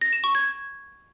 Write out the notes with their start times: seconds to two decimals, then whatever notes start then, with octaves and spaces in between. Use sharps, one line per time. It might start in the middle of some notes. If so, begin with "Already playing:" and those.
0.02 A#6
0.13 E7
0.24 C#6
0.35 G#6